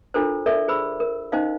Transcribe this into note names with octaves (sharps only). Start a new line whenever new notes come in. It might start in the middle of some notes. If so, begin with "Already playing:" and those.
D4 E4 F4 A4 A#4 C5
A4 A#4 D5 E5 C#6
G#4 C5 B5 E6
A#4
C#4 D#4 C5 D#5 F5